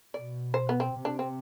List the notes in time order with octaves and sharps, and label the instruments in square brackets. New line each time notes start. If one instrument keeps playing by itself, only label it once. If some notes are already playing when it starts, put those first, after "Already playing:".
[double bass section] B2 [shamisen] D5
[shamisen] C5
B3
C4
[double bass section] C3
[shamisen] D4
C4